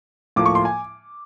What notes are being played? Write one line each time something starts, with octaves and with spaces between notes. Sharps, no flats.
A2 F3 A#3 D6
C#6
C6
G#5